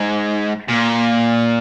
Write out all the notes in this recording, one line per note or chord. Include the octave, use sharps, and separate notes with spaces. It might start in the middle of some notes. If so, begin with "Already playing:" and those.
Already playing: G#2
A#2